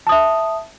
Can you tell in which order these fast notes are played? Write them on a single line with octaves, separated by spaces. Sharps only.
A5 D#6 E5